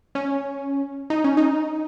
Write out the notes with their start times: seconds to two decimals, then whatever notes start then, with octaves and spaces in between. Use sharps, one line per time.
0.15 C#4
1.10 D#4
1.24 C#4
1.37 D#4